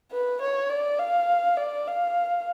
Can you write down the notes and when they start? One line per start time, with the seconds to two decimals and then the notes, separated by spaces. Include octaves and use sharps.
0.12 B4
0.42 C#5
0.70 D5
0.99 F5
1.57 D5
1.87 F5